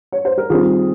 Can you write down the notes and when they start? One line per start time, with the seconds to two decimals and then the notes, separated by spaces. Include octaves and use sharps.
0.12 C#5
0.25 C5
0.38 A#4
0.50 D#3 G3 C4 F4 G#4